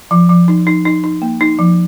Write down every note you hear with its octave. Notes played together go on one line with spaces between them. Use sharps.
F3
F3
D#4
D#4
D#4
D#4
A#3
D#4
F3